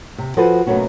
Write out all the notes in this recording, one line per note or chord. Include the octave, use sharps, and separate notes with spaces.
C3
F3 F#4 A4 B4 C5 G#5
B2 F#3 A3 A#3 C#4 F#4